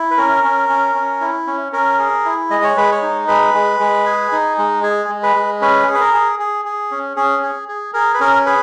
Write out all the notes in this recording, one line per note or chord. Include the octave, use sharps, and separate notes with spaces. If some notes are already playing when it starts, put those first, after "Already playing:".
Already playing: E4
B4
C#4 A#4
C#4
C#4
C#4
E4
C#4
C#4 A#4
G#4
E4
G#3 D#5
C#5
G#3 B4
C#5
D#4
G#3 B4
G#3
G#3
G#4
D#4
G#3
G#4
G#3
B4
G#3
C#4 B4
G#4
B4
A#4
G#4
G#4
G#4
C#4
C#4 G#4
G#4
G#4
G#4 A#4
B4
C#4 A#4
G#4 B4